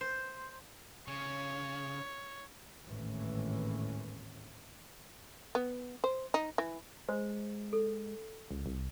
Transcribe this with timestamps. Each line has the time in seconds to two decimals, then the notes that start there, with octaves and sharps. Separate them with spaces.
0.01 C5
1.08 C#3 C#5
2.84 G#1 D#2 A2 E3 C#4
5.55 B3
6.04 C5
6.34 D#4
6.58 E3
7.09 G#3 C5
7.73 A4
8.51 C#2
8.66 C2